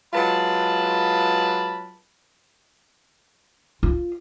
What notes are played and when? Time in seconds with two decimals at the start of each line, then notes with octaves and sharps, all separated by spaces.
0.14 F#3 G#3 F4 B4 A5 B5
3.83 F4